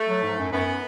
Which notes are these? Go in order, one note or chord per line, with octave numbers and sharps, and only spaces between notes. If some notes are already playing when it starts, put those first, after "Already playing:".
Already playing: A3
F#3
G#2
F#2
F#2 B3